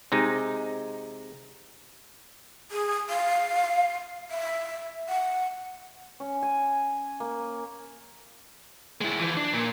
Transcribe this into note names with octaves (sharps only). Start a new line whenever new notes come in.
C3 G#3 D#4
G#4
F5
E5
F#5
C#4
G#5
A#3
G#3 E4
E3 F3
D4
A#2